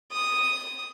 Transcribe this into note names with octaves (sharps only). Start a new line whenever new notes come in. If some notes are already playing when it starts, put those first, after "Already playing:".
D#6